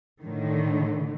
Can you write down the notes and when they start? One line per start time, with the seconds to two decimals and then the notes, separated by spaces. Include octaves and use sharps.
0.23 A2 D3 D#3